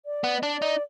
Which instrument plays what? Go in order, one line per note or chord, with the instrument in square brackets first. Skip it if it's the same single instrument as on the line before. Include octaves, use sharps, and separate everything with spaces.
[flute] D5
[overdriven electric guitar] B3
[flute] D#5
[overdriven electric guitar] D4 [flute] D5
[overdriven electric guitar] D#4